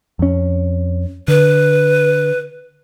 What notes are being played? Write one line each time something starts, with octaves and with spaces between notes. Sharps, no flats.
F2 C#4
D3 B4